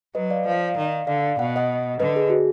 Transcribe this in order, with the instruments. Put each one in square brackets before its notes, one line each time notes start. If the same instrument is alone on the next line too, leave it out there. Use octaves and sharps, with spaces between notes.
[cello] F#3 [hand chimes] B4 D#5
[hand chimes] D5 F5
[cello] F3 [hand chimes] D5 F5
[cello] D#3
[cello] D3 [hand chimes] D5 F5
[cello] B2 [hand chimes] F#5
[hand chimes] D#5 F#5
[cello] D3 [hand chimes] B4 D#5
[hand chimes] G#4
F#4